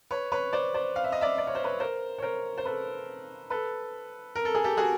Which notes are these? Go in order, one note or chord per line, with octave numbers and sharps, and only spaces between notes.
B4 C#5
B4 C#5
C5 D5
C5 D5
F5
E5
D#5
D5 E5
D5
C#5
C5
B4 C#5
A#4 C5
C#5
A#4 C5
C5
A4 B4
A4 B4
A#4
A4
G#4
G4 A4
F#4 G#4